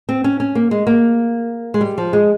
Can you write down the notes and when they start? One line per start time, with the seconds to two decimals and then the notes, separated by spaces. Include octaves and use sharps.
0.09 C4
0.24 C#4
0.40 C#4
0.55 A#3
0.71 G#3
0.87 A#3
1.74 G#3
1.81 G3
1.98 F3
2.13 G#3